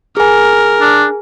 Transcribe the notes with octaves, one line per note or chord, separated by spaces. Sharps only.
G#4 A#4 G#5
D4